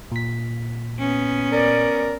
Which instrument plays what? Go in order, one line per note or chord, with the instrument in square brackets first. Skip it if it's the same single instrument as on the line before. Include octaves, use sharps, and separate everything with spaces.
[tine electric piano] A#2 B6
[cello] B3 C#4
[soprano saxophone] A#4 [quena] D5